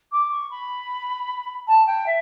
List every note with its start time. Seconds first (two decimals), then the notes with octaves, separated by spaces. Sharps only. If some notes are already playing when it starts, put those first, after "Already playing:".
0.12 D6
0.31 C#6
0.51 B5
1.67 A5
1.87 G5
2.06 E5